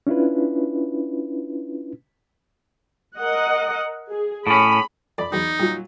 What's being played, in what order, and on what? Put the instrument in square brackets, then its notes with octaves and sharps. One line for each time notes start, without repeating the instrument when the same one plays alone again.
[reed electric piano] C#4 D4 E4 F4 B4
[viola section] A#4 D#5 F#5
G#4
[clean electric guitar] A2 C#4 [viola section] B5
[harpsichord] F2 [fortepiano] D5 B5
[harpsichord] E2 F#3 [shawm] D#4
[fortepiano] A#2 F#3 [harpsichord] G3